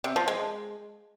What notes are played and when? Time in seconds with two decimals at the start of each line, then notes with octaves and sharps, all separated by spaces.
0.04 C3
0.16 F3
0.28 G#3